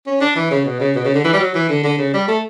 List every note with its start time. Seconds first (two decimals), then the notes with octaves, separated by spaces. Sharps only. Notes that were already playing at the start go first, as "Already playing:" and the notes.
0.07 C#4
0.21 D4
0.36 E3
0.51 C#3
0.65 B2
0.80 C#3
0.95 B2
1.05 C#3
1.15 D3
1.24 E3
1.33 G3
1.40 F#3
1.55 E3
1.69 D3
1.84 D3
1.99 C#3
2.14 G3
2.28 A3